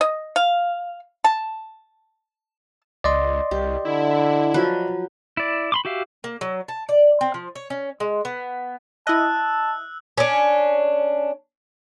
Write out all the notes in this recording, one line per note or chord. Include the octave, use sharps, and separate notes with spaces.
D#5
F5
A5
C#2 D5 D#5 C6
C2 G4
D3 E4
F3 F#3 B4
E4 D5
B5 C6 D6
F#4 G4 E5 F5
A#3
F#3
A5
D5
C4
F3
C#5
C#4
G#3
B3
E4 D#5 A5 E6 F#6
C#4 D4